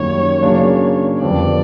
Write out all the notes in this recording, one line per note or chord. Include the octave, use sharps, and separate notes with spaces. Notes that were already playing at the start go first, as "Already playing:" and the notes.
Already playing: F#2 D#3 G3 A#3 C#5
C#3 F#3 A#3 D4
F2 D3 G3 B3 D5